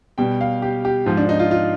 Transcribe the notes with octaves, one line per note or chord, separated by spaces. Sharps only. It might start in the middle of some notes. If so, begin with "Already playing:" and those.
B2 G3 G5
F5
G4
G4
G#2 F3
D4
D#4
F4
F4